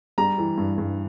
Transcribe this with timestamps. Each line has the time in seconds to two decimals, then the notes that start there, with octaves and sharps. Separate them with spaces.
0.18 G3 A#5
0.38 E3
0.58 G2
0.78 G2